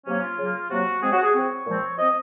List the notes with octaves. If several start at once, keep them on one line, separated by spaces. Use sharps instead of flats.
C3 F#3 A#3 C#4
F4
C#3 F#3 A#3
C3 F#3 A#3 F#4
F3 G#3 C4 G#4
F#4
G#4
F3 C4 C#5
A#2 F3 G#3 C4
F3 C4 D#5